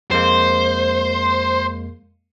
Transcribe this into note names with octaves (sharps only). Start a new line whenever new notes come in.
F2 G#3 A#3 C5